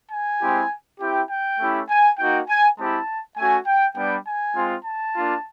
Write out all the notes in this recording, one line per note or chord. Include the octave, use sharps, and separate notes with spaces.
G#5
G#3 C4 E4 G4
C4 E4 G4 G5
G5
A3 C#4 E4 G4
G#5
A#3 D#4 F#4 G5
G#5
G#3 C4 E4 G4 A5
A3 C#4 F#4 G#5
G5
G3 B3 D4 G5
G#5
G#3 C4 F4
A5
A#3 D4 F4